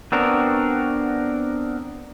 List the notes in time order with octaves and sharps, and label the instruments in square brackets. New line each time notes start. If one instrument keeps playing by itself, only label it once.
[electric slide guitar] B3 C4 D4 F#4 A#4